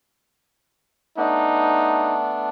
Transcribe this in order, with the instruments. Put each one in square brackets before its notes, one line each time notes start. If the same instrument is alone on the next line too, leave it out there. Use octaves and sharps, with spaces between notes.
[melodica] A3 B3 D4 [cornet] D#4